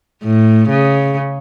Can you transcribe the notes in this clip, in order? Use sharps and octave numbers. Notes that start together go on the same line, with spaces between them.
A2
C#3